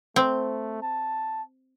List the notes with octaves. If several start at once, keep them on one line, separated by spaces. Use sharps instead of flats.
A3 C4
A5